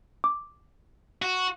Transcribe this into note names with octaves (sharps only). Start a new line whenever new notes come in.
D6
F#4